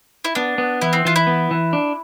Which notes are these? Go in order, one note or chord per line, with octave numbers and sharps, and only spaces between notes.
E4
B3 D4
B3
E3 E4
C4
E3 F4
E4
B3
E3
D4